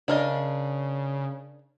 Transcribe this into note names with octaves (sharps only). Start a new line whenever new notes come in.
C#3 D4 A#4 D#5